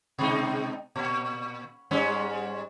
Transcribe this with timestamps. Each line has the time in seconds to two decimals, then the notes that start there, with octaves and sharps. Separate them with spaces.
0.19 B2 G#3 D#4
0.96 A#2
1.91 G#2 G3 C#4